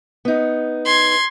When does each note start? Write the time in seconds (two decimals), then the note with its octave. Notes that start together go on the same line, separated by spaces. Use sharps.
0.25 B3 D#4
0.85 C6 G#6